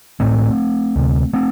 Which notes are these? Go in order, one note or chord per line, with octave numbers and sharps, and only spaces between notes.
A1 A2 A3 C4
D2 C3
A3 C4